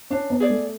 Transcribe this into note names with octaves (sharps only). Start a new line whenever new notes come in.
C#4 D4
B3
G#4 D5
A3